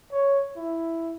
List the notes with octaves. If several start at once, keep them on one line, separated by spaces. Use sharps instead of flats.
C#5
E4